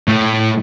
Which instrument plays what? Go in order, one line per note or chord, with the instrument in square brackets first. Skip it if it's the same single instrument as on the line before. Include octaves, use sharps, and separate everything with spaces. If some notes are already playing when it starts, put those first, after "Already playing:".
[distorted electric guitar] A2